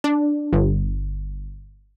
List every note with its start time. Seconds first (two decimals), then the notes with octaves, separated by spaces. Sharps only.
0.04 D4
0.53 G1